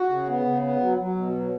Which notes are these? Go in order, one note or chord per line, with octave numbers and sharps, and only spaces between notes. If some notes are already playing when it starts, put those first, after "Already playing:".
Already playing: F#4
C#3
B3
C#3
B3
F#3
F#3
B2
F#3